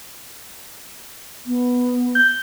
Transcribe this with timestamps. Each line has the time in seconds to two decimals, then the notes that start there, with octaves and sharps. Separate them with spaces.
1.46 B3
2.15 G6